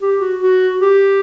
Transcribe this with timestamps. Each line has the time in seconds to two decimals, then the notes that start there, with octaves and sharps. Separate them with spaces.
0.01 G4
0.21 F#4
0.41 F#4
0.81 G4